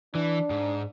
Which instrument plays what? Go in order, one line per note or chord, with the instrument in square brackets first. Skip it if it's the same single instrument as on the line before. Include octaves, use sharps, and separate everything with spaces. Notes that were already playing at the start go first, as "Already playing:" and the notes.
[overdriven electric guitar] E3 [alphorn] D4
[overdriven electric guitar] G#2